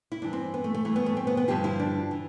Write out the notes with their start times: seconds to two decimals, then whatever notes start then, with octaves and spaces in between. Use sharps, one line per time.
0.12 E4
0.22 G2 E3 D4
0.33 C4
0.54 B3
0.64 A3
0.74 A3
0.85 G2 E3 A3
0.96 B3
1.06 A3
1.17 C4
1.27 B3
1.37 B3
1.48 G2 D3 F3 G4
1.64 E4
1.80 D4
2.11 E3